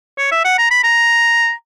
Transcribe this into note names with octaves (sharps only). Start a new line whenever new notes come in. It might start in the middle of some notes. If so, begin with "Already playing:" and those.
C#5
E5
F#5
A#5
B5
A#5